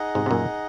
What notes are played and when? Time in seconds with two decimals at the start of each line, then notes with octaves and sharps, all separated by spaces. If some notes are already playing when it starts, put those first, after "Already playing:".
Already playing: D#4 G#4 D#5 F#5
0.15 G#2 C3
0.26 C3
0.31 F#2 A#2